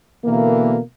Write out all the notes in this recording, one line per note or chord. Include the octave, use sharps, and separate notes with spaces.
B2 D3 E3 A#3